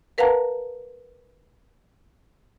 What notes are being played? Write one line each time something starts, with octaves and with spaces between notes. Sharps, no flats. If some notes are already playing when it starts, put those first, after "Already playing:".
A#4 B4 F5 F#5 A5 A#5